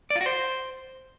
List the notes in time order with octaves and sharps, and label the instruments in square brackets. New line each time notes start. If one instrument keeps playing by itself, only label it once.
[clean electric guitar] D5
F4
F#4
C5